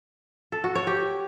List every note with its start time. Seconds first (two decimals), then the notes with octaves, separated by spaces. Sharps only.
0.52 A4
0.64 F#4
0.75 C#5
0.87 G4